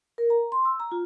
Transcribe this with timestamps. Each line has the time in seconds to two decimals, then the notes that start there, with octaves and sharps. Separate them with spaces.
0.18 A#4
0.30 A#5
0.52 C6
0.65 E6
0.80 A#5
0.92 F4